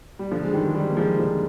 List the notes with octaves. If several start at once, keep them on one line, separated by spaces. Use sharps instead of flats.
G3
D3 F3
G#3
D#3 G3
G#3
D#3 G3
A#3
F3 G#3
D3 F3